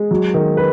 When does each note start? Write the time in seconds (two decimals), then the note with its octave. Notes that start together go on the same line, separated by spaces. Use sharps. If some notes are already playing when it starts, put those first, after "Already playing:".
Already playing: G#3
0.11 F#3
0.34 D#3
0.57 B4